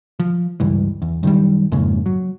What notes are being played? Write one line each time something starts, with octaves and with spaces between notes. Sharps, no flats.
F3
C#2 G2 E3
E2
F#2 D#3 F3 G3
F2 G#2 C#3 A#3
F#3